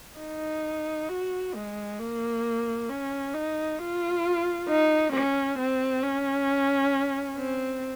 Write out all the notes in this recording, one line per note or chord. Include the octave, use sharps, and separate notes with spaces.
D#4
F#4
G#3
A#3
C#4
D#4
F4
D#4
C#4
C4
C#4
C4